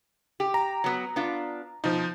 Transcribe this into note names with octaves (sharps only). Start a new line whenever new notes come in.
G4
A#5
F#3 B3
B3 D4 F4
B2 F3 D#4